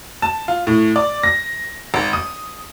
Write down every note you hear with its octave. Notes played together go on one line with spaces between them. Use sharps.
A5
F4
A2
D5
A#6
G#1
D#6